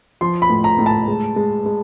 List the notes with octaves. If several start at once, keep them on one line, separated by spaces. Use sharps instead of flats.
F3 C6
B5
A2
A#5
A2
A5
G#3
G#3
G#3